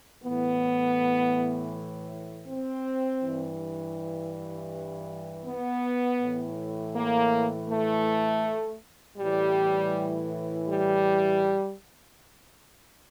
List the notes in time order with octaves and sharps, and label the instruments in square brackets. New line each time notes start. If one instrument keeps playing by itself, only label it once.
[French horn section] A2 E3 B3
C4
G2 E3
B3
A2 E3
A#3
A3
A2 E3 G3
G3